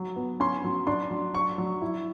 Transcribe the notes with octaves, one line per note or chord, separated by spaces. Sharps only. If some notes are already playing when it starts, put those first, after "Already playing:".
Already playing: F#3
B3
C#4 C6
F#3
D4 C6
F#3
D4 C#6
F#3
E4